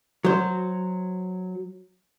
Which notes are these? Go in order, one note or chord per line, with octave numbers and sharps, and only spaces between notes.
F#3 C5